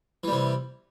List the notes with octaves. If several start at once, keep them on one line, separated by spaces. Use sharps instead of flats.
C3 E3 G3